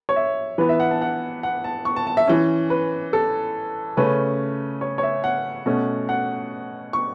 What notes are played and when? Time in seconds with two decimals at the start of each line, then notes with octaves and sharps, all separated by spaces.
0.09 C#5
0.16 E5
0.58 E3 B3 B4
0.69 E5
0.80 F#5
0.91 A5
1.01 F#5
1.43 F#5
1.64 A5
1.85 C#6
1.96 A5
2.07 A5
2.17 E5
2.27 E3 C#4
2.70 B4
3.13 A4
3.97 C#3 A3 C#4 B4
4.81 C#5
4.98 C#5
5.03 E5
5.24 F#5
5.66 B2 A3 C#4
6.09 F#5
6.93 C#6